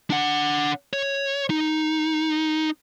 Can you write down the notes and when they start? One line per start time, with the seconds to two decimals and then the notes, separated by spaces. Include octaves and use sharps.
0.10 D4 F#5
0.93 C#5
1.50 D#4